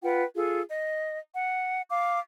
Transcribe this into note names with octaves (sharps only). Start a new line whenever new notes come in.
F4 B4 F#5 G5
F4 G#4 A4
D#5
F#5
F5 D6